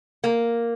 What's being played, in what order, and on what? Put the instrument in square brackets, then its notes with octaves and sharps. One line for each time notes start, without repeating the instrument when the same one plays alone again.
[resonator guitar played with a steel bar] A#3